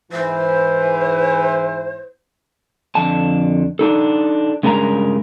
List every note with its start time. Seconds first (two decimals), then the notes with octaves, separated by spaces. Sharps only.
0.12 G#2 E3 C5
2.95 F2 D3 A5
3.79 D4 D#4 A4
4.63 G2 C#3 G#3 A#4 G#5 A#5